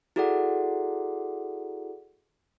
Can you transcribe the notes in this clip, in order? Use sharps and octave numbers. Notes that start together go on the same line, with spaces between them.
E4 F#4 G#4 A4 D5 F#5